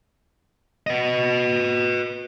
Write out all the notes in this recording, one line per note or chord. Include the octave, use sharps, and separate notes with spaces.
B4 D#5